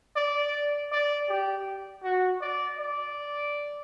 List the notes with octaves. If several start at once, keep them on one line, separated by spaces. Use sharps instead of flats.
D5
D5
G4
F#4
D5
D5